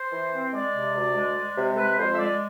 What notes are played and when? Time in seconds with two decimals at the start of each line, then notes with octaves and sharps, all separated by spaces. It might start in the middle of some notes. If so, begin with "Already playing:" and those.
Already playing: C5
0.12 E3
0.33 C4
0.54 G#3 D5
0.75 C3
0.96 D2
1.15 G#3
1.36 G#3
1.57 C3
1.74 A4
1.78 G#3 B4
1.98 F2 C5
2.14 E5
2.19 G#3 D5